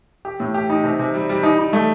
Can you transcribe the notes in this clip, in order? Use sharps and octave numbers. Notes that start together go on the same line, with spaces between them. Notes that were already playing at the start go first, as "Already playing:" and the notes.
G4
A2
G4
D#4
C3
C3
G3
G3
D#4
D#4
A3